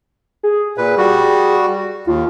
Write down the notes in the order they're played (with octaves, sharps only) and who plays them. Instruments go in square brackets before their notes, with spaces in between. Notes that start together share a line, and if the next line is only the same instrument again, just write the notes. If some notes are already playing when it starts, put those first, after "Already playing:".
[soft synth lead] G#4
[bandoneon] A#2 B4
G3 F#4
[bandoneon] D#2 [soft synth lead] F4